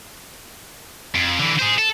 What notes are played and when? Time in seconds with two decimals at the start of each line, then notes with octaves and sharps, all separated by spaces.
1.15 F2
1.39 D3 E3
1.59 G#4 C5
1.78 A4